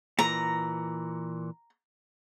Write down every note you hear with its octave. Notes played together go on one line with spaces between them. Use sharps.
A#2 E3 A#5